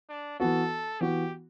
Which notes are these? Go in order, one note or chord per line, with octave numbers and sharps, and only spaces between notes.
D4
E3 B3 F#4 A4
E3 B3 F#4 G4